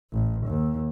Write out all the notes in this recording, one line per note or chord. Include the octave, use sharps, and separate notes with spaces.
A1
D#2